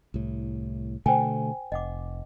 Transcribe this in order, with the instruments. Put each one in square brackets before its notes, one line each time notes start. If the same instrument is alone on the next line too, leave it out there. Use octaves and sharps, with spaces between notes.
[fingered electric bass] C2 A2
[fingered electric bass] B2 D3 A3 [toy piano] C5 G5 G#5
[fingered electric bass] F1 [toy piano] D#5 F#5 D6